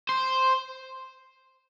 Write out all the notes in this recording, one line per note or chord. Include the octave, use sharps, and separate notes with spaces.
C5